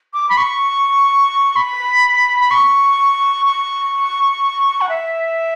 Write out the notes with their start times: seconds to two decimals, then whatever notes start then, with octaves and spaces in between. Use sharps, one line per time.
0.13 D6
0.29 B5
0.37 C#6
1.56 B5
2.40 B5
2.51 C#6
3.46 C#6
4.81 F#5
4.89 E5